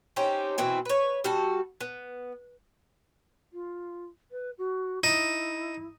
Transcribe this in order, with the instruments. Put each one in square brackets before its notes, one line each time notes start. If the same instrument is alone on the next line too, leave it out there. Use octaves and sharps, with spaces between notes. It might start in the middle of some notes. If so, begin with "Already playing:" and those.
[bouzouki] C4 C#4 D#4 G4
B2 E3 C4 E4
B4 C#5
G3 F#4 A4
B3
[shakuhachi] F4
B4
F#4
[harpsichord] D#4 [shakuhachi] E4